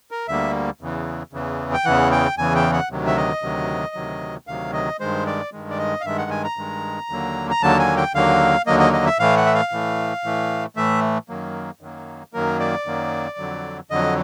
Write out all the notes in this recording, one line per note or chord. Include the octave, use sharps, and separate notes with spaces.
A#4
D2 D3 G3 A#3 E5
E2 C#3 E3
E2 C#3 E3
G5
E2 C#3 E3 F#5
G5
E2 C#3 E3 G#5
G5
F#5
D2 C3 D#3 F#3
E5
D#5
D2 C3 D#3 F#3
D2 C3 D#3 F#3
D2 C3 D#3 F#3 F5
D#5
G2 D#3 G#3 C5
D5
G2 D#3 G#3
D5
D#5
F5
G2 D#3 G#3 E5
F#5
G#5
A#5
G2 D#3 G#3
D#2 D3 F#3 A#3
A#5
D#2 D3 F#3 A#3 A5
G#5
G5
D#2 D3 F#3 A#3 F5
D#2 D3 F#3 A#3 D#5
D#5
D#5
E5
A2 E3 A3 F5
F#5
E5
F5
A2 E3 A3
A2 E3 A3
A2 E3 A3 E5
F#2 D#3 F#3 A#3
F#2 D#3 F#3 A#3
F#2 D#3 F#3 A#3 A#4
D5
F#2 D#3 F#3 A#3
F2 D3 F#3
F2 D3 F#3 D#5